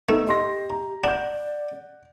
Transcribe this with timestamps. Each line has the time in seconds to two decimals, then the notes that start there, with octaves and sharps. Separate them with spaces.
0.09 A3 B3 D#4 E6
0.27 G4 D#5 C6 A#6
0.70 A#5
1.04 D4 D5 F#5 G6